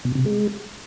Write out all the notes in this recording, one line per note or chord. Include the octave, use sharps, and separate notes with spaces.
B2
C3
G#3